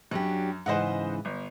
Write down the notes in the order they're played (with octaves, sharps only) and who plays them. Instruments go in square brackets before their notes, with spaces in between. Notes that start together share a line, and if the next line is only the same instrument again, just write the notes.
[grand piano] F#2 [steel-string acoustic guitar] F#3 D4 G4
[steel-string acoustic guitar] G#2 C#3 E3 [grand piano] C5 D#5 F#5
[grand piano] G1